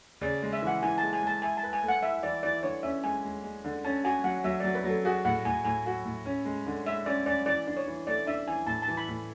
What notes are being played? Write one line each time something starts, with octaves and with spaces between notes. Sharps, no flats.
C#3 D5
G#3
E5
E3 F#5
E3 G#5
G#3 A5
G#5
G#3 A5
E4 G#5
A5
B4
G#5
A3
F#5
E4 E5
E3 D5
E3 D5
D3 C#5
C#4 E5
G#3 G#5
G#3
G#3
D3
C#4 A5
F#4 G#5
F#3 F#5
F#3 E5
F#3 D5
B4
F#3
A4
F#4 G#4
A2 F#5
A2 G#5
A2 G#5
F#4
A2
C#4
G#3
D3
G#3 E5
C#4 D5
C#4 D5
E3 D5
D4
C#5
E3
A3 D5
D4 E5
E3 G#5
A2 A5
A5
E3
B5
A2